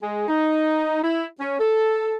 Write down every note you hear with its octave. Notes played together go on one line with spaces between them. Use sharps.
G#3
D#4
E4
C#4
A4